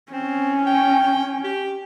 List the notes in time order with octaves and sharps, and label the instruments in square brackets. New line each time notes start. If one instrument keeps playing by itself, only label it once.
[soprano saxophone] C4 [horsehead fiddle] C#4
[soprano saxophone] G5
G4